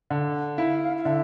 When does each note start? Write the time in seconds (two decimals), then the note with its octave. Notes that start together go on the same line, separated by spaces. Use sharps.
0.10 D3
0.57 E4 F5
0.97 F5
1.04 D3 E5